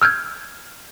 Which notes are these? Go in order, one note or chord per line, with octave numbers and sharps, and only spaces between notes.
E6 F6 G6 G#6